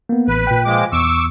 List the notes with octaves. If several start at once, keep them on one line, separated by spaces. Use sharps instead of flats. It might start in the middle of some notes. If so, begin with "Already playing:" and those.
A#3 B3
A1 B4
A#2 G5
F3 G#3 D6
E2 C#6 D6 E6